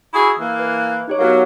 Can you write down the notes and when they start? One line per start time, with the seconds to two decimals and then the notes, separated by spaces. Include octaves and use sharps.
0.14 E4 F#4 G#4 D#6 E6
0.39 E3 A#3
0.59 B4
1.08 D#4 G4 C#5
1.19 F#3 B3 A#4 F5